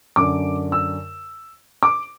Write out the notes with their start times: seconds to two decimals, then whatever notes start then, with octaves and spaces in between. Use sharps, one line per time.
0.16 F#2 D3 D6
0.72 E6
1.83 D6